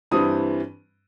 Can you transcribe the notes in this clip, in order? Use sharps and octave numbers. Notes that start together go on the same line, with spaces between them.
G2 E3 G3 C4 D#6